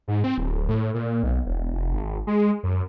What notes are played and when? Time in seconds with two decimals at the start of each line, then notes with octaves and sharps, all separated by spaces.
0.08 G#2
0.24 C4
0.38 D1
0.69 A2
0.94 A#2
1.23 B1
1.46 E1
1.73 F1
1.93 G#1
2.27 G#3
2.63 F#2